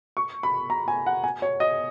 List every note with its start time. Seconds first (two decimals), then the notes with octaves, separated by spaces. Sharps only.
0.17 C#6
0.43 B5
0.70 A#5
0.88 G#5
1.06 F#5
1.24 G#5
1.42 C#5
1.60 D#5